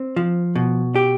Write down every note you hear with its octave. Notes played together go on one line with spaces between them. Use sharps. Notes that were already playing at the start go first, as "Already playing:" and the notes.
Already playing: C4
F3
B2
G4